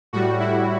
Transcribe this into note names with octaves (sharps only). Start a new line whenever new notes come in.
A2 G3 F#4
E4